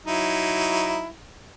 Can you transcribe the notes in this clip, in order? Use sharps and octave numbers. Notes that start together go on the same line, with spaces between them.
F#3 D#4 E4